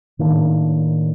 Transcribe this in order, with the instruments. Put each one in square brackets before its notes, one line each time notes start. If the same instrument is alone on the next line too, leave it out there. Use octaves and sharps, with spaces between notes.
[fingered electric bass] A2 D#3 A#3 D4